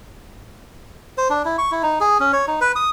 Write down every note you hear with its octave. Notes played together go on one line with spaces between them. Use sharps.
C5
D4
E4
C#6
E4
D#4
G#4
C#4
C#5
D#4
B4
D#6